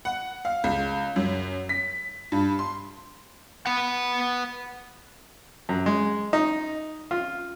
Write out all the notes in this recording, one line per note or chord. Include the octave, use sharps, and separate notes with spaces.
F#5
F5
C#2
F#2
B6
G2
C6
B4 F#5
F#2
G#3
D#4
F4